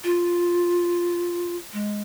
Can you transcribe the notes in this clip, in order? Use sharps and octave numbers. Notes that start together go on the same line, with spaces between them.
F4
G#3